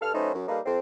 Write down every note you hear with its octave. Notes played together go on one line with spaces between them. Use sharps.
G2 A4 F6
F#3 A3 C#4 D#4 B4 C5
F#2
G3 A#3 D#4 A4 B4 F5
F2 C4